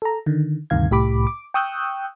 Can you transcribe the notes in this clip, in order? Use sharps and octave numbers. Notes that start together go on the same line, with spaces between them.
A4 A#5
D3 D#3
D2 G2 C3 D#3 F5 G#6
C2 A2 G4 B5 D6
D6
G5 C#6 D#6 E6 F#6 G6